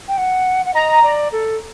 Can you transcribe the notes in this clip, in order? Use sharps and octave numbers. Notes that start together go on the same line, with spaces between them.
G5
F#5
F#5
D#5 A#5
D5
A4